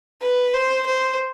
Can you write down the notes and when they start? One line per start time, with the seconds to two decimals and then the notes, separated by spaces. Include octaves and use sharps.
0.22 B4
0.54 C5
0.86 C5